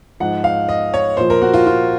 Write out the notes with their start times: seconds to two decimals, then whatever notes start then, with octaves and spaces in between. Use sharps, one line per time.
0.20 G#2 F3 F#5
0.44 F5
0.69 D#5
0.94 C#5
1.17 A#2 F3 C5
1.30 A#4
1.42 F#4
1.54 F4
1.67 F4